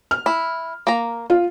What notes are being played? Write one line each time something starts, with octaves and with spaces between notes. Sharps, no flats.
F6
E4
A#3 A#5
F4